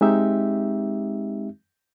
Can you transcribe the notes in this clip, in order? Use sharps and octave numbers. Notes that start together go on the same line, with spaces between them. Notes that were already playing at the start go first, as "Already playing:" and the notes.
G#3 C4 D#4 G4 E5